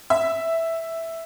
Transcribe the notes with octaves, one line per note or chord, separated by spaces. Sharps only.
E5